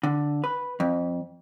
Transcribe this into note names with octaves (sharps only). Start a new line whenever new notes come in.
D3
B4
F2